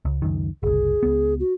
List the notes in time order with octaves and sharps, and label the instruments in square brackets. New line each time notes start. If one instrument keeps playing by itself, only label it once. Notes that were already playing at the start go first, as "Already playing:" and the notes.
[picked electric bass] C#2
C#2 F#2 D#3
[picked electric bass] F#1 C2 [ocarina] G#4
[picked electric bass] C#2 B3
[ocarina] F#4